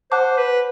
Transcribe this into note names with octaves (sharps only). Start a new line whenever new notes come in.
C5 C#5 F#5 A5 D6 F#6
B4